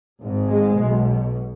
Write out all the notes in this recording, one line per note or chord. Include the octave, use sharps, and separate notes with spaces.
G#1 G#2
G#3
B1 B2